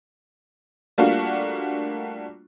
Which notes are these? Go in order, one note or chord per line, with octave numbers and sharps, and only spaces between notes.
G3 A3 A#3 D4 F4 F#4